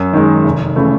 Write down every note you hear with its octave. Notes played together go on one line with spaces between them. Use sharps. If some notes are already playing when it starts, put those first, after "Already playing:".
Already playing: F#2
D#3 G#3
F1
C#3 E3 A3